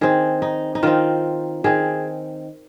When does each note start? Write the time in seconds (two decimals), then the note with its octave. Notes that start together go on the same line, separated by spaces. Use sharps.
0.01 D#3 C4 G#4
0.42 D#4
0.75 D#4
0.83 D#3 C4 F4
1.64 D#3 C4 G#4